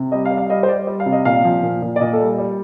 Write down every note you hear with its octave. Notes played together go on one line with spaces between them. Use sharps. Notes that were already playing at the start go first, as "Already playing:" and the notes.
Already playing: C3
G3 D#5
F5
G3
F5
G3 D#5
C5
G3 D5
G3
F5
C3
D#5
A#2 F5
F3
A#2
A#2
D5
A#2 D#5
A4
G3
G3